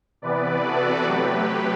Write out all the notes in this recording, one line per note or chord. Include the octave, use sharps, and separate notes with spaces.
C3 E3 B3 B4 D5
F#4 A4
C3 F#3 A3 G4 B4